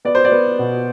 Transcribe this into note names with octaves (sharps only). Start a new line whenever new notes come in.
B3 D5
C5
D5
B3
B2